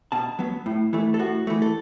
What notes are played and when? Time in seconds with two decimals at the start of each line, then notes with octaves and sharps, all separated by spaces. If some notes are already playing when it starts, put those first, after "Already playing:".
0.12 B2 A5
0.39 F#3 B3
0.66 A2
0.93 E3 A3
1.14 A4
1.19 A2 F#4
1.47 E3 A3
1.62 A4